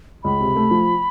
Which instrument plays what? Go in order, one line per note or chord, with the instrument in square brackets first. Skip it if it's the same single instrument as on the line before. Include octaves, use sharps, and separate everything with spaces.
[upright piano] C#2 [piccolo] B5
[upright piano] C3
A3
F3